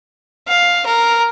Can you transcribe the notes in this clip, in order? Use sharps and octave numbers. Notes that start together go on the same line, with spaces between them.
F5
A#4